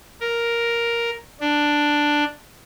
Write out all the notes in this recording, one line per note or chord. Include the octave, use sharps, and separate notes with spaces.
A#4
D4